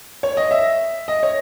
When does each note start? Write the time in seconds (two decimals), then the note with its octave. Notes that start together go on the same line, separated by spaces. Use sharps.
0.23 C#5
0.37 D#5
0.51 E5
1.08 D#5
1.23 C#5